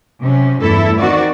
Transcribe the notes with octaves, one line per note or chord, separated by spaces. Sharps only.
C3 F#3 C#4
E2 G2 A3 E4 A4
D#3 C4 F#4 D5